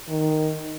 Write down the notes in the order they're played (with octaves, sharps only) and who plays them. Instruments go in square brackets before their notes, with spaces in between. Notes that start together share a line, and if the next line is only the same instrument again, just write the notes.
[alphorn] D#3